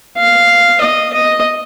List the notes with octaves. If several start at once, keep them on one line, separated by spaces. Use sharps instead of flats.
F5
D#5
D#5